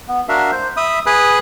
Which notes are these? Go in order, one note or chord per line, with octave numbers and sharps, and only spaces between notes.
B3
D4 F#4 A#4 E5 F5
C5
E5 B5 D#6
G#4 B4 B5 D#6 F#6